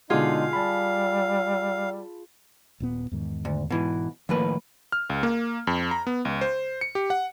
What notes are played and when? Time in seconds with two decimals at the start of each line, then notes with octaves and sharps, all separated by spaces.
0.10 B2 D3 G#3 D#4 F4 G#4 F5
0.53 G3 A5 B5
2.80 D#1 A#2 B3
3.11 E2 G#2 D#3
3.45 D2
3.70 G#2 B2 E3
4.29 D#2 A2 F3 A#3 B4
4.92 F6
5.10 C#2
5.23 A#3
5.67 F2
5.91 A#5
6.07 B3
6.25 C#2
6.41 C5
6.81 C#7
6.95 G4
7.10 F#5